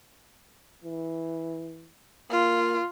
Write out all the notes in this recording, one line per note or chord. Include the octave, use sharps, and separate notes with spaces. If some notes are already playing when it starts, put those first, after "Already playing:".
E3
A#3 F4